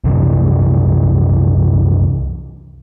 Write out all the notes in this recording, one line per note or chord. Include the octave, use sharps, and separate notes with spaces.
C2 F#2 C3 E3